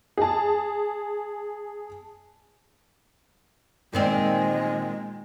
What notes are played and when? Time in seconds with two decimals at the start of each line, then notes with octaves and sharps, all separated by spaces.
0.17 G#4 A5
3.93 A#2 D#3 G#3 C4